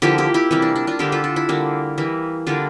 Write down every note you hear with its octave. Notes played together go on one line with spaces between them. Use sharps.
D3 F3 A#3 E4 G4
E4 G4
E4 G4
C3 E3 G3 A#3
D4
D4
D4 F4
D3 G3 A#3 E4 G4
F4 A4
D4
E4
D3 G3 A#3
E3 G3 A#3
D3 G3 A#3 D4 F4